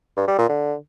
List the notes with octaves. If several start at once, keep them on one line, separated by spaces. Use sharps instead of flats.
G2
G3
A#2
D3